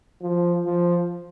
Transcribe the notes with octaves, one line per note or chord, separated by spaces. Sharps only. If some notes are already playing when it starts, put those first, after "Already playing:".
F3
F3